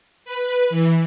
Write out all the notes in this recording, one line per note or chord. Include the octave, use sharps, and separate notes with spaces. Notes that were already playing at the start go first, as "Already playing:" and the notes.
B4
E3